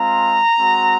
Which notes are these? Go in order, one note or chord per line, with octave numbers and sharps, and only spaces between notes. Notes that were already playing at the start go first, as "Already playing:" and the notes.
Already playing: G#3 C4 F4 A#5
G#3 C4 F#4